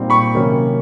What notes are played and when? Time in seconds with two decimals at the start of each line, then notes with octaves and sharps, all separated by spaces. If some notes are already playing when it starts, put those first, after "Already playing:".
Already playing: A#2 G3 C4 D#4
0.10 B5 C#6
0.35 C3 D#3 F#3 A#3 C#4